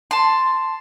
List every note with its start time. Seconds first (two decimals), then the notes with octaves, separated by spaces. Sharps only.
0.11 A5 C6